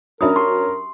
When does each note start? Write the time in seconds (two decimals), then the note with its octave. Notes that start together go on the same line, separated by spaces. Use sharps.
0.21 F#3 C#4 D4 A#4 E5 B5 D#6
0.36 G4 A5 C6 C#6